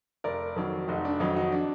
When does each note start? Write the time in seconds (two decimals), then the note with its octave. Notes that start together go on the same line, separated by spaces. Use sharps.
0.24 F1 A#4 D5
0.56 F2 D#3 F#3
0.88 F1 D#4 F#4
1.05 D4
1.20 F2 D#3 F#3 D#4
1.36 D#4 F#4
1.52 D4